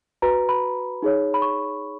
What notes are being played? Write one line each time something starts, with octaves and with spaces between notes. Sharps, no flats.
F#4 B4 A#5
B5
D#4 G#4 C#5
B5
C#6